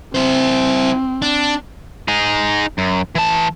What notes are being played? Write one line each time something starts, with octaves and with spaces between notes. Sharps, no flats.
C4 E4 C5
D4
D#4 G#4
F#2
E3 A5